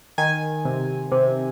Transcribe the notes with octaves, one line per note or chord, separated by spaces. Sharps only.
D#3 G#5
C3
C3